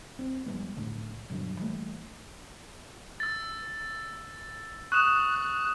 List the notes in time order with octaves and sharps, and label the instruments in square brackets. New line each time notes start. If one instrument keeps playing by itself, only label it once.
[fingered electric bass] C4
F2 G3 G#3 B3
C2 A2 D3 A3
G2 B2 D3 F#3
E3 G3 A3 A#3
[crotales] E6 A6
[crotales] C#6 D#6 E7 [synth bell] F#6